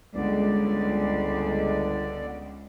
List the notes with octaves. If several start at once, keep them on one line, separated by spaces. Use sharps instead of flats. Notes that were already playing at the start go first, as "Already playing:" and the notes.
G1 C#2 D3 G#3 D5